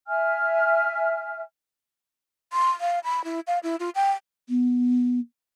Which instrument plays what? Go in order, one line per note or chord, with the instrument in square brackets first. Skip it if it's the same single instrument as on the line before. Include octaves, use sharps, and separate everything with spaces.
[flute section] E5 G#5 F6
[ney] C6
F5
B5
E4
F5
E4
F4
G5
[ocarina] B3